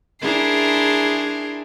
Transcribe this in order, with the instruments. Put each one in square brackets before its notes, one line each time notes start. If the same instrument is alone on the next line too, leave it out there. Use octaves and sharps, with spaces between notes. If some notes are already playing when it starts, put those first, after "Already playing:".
[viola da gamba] D4 E4 G#4 [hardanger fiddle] A#4 C6